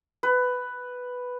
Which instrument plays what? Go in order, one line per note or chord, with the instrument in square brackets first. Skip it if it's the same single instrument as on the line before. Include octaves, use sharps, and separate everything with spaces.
[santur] B4